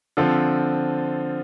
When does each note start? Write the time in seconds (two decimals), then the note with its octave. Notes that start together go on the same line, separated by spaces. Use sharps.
0.17 D3 F3 C4 F4 A4